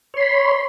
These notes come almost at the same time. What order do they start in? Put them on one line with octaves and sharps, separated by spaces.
C#5 C6 B5